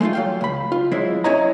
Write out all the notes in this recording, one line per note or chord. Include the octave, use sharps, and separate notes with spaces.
G#3 A3 D#4 F4
F#3 F5 G5
C#2 B5
F4
F#3 G#3 C4 E4 E5
C#4 E4 C#5 D#5 A#5